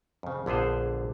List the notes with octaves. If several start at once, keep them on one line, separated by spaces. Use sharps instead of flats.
F2 C#3
A#1 D3 B3 G#4 C5